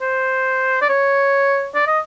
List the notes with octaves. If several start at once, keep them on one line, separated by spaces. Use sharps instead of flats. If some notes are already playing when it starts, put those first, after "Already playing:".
C5
D5
C#5
D5
D#5